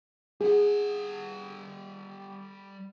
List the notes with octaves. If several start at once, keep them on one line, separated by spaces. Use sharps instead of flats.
G3 G#4 F#5